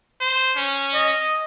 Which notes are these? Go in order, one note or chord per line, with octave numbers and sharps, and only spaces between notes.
C5
C#4
D#5